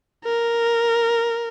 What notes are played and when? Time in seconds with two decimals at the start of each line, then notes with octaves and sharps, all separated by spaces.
0.25 A#4